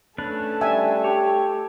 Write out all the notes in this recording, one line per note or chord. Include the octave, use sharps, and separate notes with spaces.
A3 C#4 D4 A4 B4
G3 E5 G#5
G4 C#5